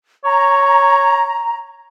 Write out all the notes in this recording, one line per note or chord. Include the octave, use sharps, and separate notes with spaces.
C#5 A#5